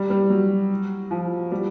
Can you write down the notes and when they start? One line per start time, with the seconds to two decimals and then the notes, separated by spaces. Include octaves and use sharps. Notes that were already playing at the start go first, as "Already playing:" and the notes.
Already playing: G3
0.10 G3
0.30 F#3
1.11 F3
1.52 G3